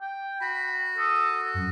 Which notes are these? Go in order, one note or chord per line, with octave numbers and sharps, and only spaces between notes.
G5
F#4 B5
A4 D#6
F#2